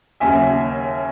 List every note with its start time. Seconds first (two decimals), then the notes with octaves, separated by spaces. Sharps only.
0.20 D#2 C#3 F#3 E5 G#5